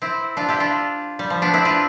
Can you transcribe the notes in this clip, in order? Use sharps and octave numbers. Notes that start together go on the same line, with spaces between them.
C4 E4
D4 F4
E4 G4
D4 F4
G3
F3
B3 D4
C4 E4
D4 F4